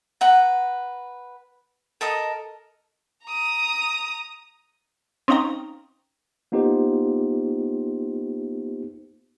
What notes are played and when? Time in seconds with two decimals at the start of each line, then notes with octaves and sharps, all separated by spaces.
0.21 B4 F#5 A#5
2.01 A4 A#4 D#5 D#6
3.25 A#5 D#6
5.28 C4 C#4 D#4 F5 G5 A#5
6.52 A#3 B3 D#4 F4 G4 C5